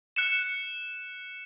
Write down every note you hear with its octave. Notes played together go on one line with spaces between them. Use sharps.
F#6 C#7 E7